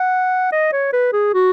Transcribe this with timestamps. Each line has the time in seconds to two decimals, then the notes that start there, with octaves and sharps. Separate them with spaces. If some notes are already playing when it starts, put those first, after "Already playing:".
Already playing: F#5
0.52 D#5
0.72 C#5
0.93 B4
1.13 G#4
1.34 F#4